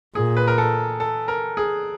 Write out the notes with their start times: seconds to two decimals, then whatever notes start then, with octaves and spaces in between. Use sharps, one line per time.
0.15 A#2 G#4
0.37 B4
0.47 A#4
0.58 A4
1.00 A4
1.28 A#4
1.57 G#4